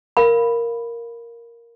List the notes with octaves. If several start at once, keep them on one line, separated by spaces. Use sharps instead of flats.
A#4 F5 B5